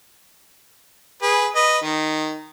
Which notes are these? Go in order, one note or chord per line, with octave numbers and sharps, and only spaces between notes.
G#4 B4
B4 D#5
D#3